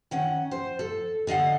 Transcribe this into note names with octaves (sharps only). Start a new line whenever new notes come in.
D#3 C#4 F#5
C5
A4
D3 D#5 F5 F#5